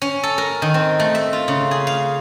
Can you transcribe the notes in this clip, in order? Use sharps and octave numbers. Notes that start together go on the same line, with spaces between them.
C#4
A4
A#4
D#3
C4
A3
E5
F4
C#3
G#4
F5